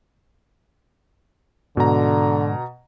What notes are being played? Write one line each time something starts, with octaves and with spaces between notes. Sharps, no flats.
G#2 B2 D3 A#5